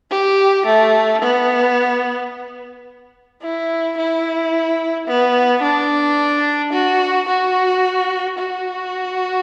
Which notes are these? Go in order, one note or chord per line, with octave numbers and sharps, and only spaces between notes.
G4
A3
B3
E4
E4
B3
D4
F#4
F#4
F#4